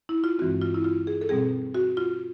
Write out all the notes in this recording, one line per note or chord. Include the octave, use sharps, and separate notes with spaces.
E4
F4
G2 E3 G#3 C4 F#4
F4
E4
F4
G#4
A4
B2 G3 C4 G#4
F#4
F4